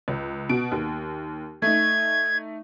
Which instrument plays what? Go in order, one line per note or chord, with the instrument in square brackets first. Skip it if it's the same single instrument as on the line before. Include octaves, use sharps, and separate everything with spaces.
[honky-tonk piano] C#2
B2 D7
D#2
[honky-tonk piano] A3 D#4 [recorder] G#6